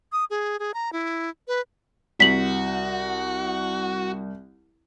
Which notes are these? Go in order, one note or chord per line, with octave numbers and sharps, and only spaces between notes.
D#6
G#4
G#4
A#5
E4
B4
C2 F#4 B6 F#7